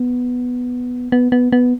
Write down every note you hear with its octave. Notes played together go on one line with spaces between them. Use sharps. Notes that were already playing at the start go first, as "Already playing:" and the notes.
Already playing: B3
B3
B3
B3